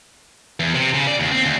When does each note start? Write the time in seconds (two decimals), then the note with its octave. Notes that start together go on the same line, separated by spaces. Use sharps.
0.60 E2
0.75 C3
0.95 C#3
1.07 D5
1.20 D#2
1.32 C4
1.46 D2